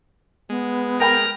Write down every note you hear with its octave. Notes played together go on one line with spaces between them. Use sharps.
G#3 B3
A#4 G5 B5 F6 A#6